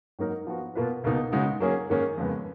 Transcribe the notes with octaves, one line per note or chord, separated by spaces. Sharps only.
G#2 F#3 A#3 D#4 A#4
F3 B3 F#4
B2 A#3 F4 B4
C#2 B2 A#3 D#4
C#3 G#3 D#4 F#4
F#3 A#3 C#4 G#4
G#2 D#3 A#3 C#4 G#4
F2 C#3 G#3 B3